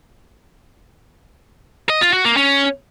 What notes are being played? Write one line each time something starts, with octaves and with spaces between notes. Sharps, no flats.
D#5
F4
F#4
A#3
C#4